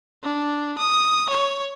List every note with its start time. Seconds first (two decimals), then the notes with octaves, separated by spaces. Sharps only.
0.23 D4
0.78 D#6
1.30 C#5